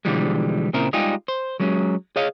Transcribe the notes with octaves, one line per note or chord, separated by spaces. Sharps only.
B2 D3 E3 F3 G3 G#3
A#2 C#3 C4 E4 A#4
G3 G#3 D#4 F4 G4 G#4
C5
F#3 G#3 C#4
G#4 C#5 D#5 F5